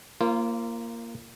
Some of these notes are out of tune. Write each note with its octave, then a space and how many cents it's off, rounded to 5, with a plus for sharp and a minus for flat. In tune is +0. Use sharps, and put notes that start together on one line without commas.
A#3 -5 F4 -30 C5 +35